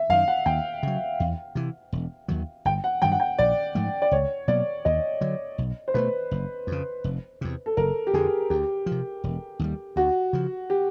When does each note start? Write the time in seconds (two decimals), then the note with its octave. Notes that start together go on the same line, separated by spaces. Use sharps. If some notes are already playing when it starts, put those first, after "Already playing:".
Already playing: E5
0.10 F#2 F5
0.12 D#3
0.28 F#5
0.46 D#2 G5
0.83 C#3 F#3
1.20 E2
1.55 C3 E3
1.93 E1
2.28 D#2 D#3 F#3
2.65 G1 G5
2.84 F#5
3.02 G2 D#3 F#3 G5
3.12 F#5
3.20 G5
3.38 A#1 D5
3.75 G#2 F3 A3
4.02 D5
4.11 C#2 C#5
4.48 B2 F#3 A#3 D5
4.85 D#2 D#5
5.21 D3 F#3
5.58 B1
5.88 C5
5.94 B2 F#3 A3 B4
6.31 F#1
6.67 F2 C#3
7.04 F1
7.41 E2 C3
7.66 A4
7.77 F#1 A#4
8.07 G4
8.14 F2 D3 G#4
8.50 D2 G4
8.86 F3
8.91 C3
9.24 E1
9.59 D#2 D#3 G3
9.96 D2 F#4
10.33 C#3 F3
10.70 G4